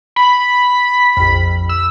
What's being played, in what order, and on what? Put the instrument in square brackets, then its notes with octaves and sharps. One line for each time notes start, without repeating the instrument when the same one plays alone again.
[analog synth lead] B5
[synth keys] A#1 F2
[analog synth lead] E6